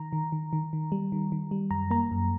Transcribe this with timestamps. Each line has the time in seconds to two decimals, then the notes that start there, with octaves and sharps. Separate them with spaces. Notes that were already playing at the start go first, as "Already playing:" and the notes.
Already playing: D#3 A#5
0.13 D#3
0.32 D#3
0.53 D#3
0.73 D#3
0.92 G3
1.12 D#3
1.32 D#3
1.51 G3
1.71 F#2 A#5
1.91 A#3 A#5
2.11 F#2